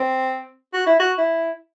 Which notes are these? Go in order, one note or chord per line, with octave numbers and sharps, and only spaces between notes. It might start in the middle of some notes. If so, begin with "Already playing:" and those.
Already playing: C4
F#4
E4
F#4
E4